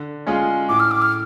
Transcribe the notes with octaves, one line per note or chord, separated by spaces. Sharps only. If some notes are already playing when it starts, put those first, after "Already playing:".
Already playing: D3
G#3 C#4 F4 G#4
A2 D6
F6
D6
F6